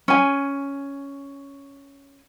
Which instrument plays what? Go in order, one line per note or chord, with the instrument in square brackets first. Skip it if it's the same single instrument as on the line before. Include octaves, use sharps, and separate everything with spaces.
[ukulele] C#4 G#5